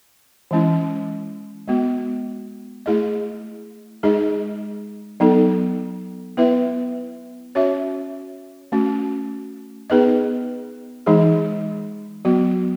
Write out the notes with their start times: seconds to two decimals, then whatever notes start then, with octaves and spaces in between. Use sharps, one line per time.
0.51 E3 G#3 C#4 E4
1.68 G#3 B3 F#4
2.86 A3 E4 G#4 D#5
4.03 G#3 D#4 G#4 D#5
5.20 F#3 B3 D#4 A4
6.37 B3 E4 B4 E5
7.55 C#4 F#4 C#5 E5
8.72 A3 C#4 F#4
9.90 B3 D#4 G#4 B4 D#5
11.06 E3 G#3 D#4 G#4
12.25 F#3 B3 F#4